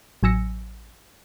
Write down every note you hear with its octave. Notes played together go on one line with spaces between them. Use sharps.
A1 F#3 G#5 E6 A#6 C#7